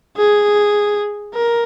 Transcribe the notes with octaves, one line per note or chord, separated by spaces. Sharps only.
G#4
A#4